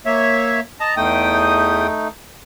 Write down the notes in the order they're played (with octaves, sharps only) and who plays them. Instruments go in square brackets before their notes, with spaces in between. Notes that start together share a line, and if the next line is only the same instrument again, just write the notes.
[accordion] A#3 C#5 E5
[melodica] D#5 [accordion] A5 A#5
[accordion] E2 G5 D#6 [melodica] A3 D#4